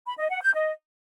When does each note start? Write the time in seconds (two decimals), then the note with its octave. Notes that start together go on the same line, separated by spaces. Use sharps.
0.06 B5
0.18 D#5
0.30 F#5
0.42 G6
0.54 D#5